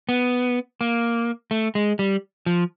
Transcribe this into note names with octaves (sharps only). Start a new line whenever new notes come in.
B3
A#3
A3
G#3
G3
F3